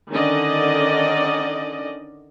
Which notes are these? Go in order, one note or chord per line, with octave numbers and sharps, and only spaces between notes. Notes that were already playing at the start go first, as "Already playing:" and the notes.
D3 D#3 C#4 D5 D#5